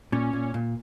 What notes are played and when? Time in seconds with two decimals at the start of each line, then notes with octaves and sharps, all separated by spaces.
0.12 A#2 C#4
0.33 A#2
0.54 A#2